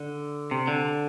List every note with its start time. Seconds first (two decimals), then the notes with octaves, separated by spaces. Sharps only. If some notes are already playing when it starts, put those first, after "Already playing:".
Already playing: D3
0.51 C3
0.67 D3